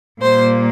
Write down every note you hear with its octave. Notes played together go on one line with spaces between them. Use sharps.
A#2 G3 A#3 C5